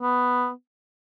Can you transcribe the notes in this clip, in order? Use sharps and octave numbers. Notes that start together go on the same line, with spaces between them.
B3